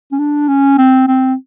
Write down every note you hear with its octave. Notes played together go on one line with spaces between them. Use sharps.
C#4
D4
C#4
C4
C4